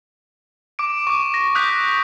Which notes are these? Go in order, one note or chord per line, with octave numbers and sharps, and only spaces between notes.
D6 D7
C#6 D6
A#6
D#6 F#6 G6 B6